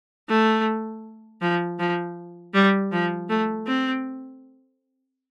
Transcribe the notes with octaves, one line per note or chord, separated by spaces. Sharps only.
A3
F3
F3
G3
F3
A3
C4